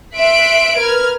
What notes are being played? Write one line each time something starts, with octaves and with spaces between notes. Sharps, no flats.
E5 C6 F#6 B6 D7
A#4 B4 F6 G#6